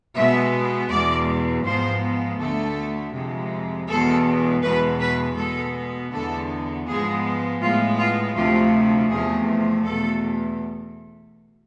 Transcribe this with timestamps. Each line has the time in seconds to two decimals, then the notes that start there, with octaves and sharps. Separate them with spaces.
0.15 B2 G#3 B3 E5
0.89 E2 B2 G#3 D5
1.65 G#2 F3 G#3 B3 C5
2.39 D2 D3 A3 A4
3.13 F2 C3 G#3
3.88 E2 B2 G#3 A4
4.62 E2 B2 G#3 B4
5.00 B4
5.37 B2 G#3 B3 A4
6.12 E2 D3 G#3 B3 A4
6.86 G#2 F3 G#3 B3 G#4
7.61 A2 G#3 B3 F4
7.98 F4
8.35 D2 C3 F3 A3 F4
9.10 E2 C3 F3 A3 G#4
9.85 E2 B2 A3 A4